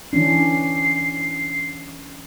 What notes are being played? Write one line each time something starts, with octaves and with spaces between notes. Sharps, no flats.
E3 C#4 D4 C7